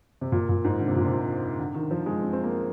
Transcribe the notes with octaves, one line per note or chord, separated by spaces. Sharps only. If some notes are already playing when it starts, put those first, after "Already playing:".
C3
A#2
A#2
G#2
D3
C3
A#2
C3
D3
D#3
F3
G#3
C4
C4
A#3